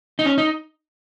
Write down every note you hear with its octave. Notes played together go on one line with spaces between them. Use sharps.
D#4
C#4
D#4